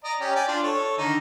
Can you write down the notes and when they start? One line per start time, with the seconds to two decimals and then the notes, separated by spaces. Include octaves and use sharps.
0.04 D5 D#5 A#5
0.20 C#4 G4
0.36 D5 G5 G#5
0.48 D4 F4
0.63 A4 C#5
0.98 D3 D#3 D#4